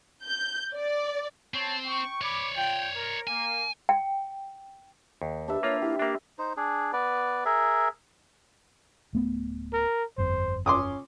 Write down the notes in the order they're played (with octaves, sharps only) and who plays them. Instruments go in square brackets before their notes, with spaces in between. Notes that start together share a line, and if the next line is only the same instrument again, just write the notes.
[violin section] G6
D5
[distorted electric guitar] C4 [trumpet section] C#5 A5
[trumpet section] G5 C#6
[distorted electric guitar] C#5 D5 [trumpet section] B5 D6
[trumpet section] F4 G5
A#4
[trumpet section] A#3 [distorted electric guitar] G#5
[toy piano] G5
[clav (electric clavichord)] D#2
[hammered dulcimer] D4 B4 E5 [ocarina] G4
[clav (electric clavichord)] A#3 F4 [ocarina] C#5
[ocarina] E4 [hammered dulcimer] G4
[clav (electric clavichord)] A#3 D4 [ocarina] E5
[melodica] D#4 C5
D4 G#4
B3 B4 D5
G#4 A#4 E5
[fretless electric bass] D1 A3 B3
[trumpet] A#4
[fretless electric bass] G1 F2 [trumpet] C5
[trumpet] C#4 [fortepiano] C6 D6 D#6